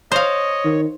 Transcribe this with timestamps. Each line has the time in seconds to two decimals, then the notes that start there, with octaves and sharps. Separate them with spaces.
0.12 C5 C#5 D#5 F5
0.64 D#3